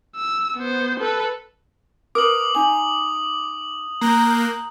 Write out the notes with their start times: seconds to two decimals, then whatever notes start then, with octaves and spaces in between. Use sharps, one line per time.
0.16 E6
0.57 B3 C5
1.00 A4 B4
2.15 A#4 B4 D6 D#6 F#7
2.55 D#4 G#5 F#7
4.01 A#3 A#5 F#6 G6